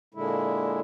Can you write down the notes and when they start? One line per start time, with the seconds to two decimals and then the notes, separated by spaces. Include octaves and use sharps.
0.14 A#2 D3 G#3 E4